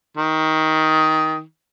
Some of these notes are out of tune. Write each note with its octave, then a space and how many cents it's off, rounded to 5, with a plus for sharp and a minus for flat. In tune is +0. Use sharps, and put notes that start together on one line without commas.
D#3 +15